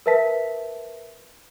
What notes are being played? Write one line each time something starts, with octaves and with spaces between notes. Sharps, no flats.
A#4 B4 E5 A5 B6